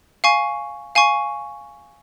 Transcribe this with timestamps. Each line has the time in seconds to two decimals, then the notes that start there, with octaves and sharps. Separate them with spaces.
0.24 F5 G#5 C#6
0.95 F5 G#5 C#6